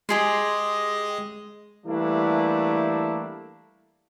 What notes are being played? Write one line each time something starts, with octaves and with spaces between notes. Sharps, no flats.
G#3 G4 G#4 D#5 C6
E3 G3 A3 A#3 D4 E4